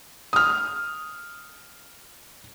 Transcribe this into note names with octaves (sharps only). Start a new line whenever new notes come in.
D#6 F6